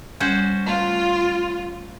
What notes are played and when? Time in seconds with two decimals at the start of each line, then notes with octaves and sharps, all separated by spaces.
0.20 G3 C#4 F#4 C5
0.67 A3 F4